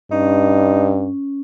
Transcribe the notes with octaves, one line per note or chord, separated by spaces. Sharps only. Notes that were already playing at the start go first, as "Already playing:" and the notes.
G2 C#4 D#4